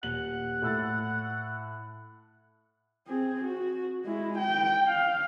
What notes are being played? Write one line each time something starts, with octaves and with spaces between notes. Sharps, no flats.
D#1 F#5 F#7
A2 E6 A6
C4 G#4
F#4
G#3 E4
G5
F5